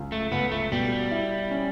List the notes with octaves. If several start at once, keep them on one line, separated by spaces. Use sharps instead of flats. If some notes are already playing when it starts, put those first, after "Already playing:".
Already playing: C#2
A3
C#2 B3
A3
B2 G3
E4
C#4